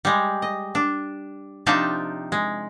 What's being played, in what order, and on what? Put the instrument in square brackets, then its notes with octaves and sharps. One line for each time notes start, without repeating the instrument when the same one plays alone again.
[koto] G3 G#3
D#5
D4
C3 F3 D4 D#4 G5 A5
G#3